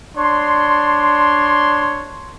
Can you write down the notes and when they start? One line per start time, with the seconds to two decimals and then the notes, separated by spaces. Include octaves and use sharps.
0.17 D4 C#5 C6